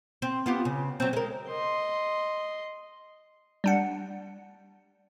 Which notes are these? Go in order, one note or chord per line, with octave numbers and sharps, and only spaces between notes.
C4
B3 F4 G4
C#3
F#3 C4
G#3 A#4
D#5 C6
G3 D4 F#5